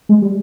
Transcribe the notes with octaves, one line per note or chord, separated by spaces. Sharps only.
G#3
G3